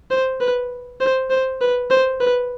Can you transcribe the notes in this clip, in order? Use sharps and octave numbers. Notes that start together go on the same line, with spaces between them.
C5
B4
C5
C5
B4
C5
B4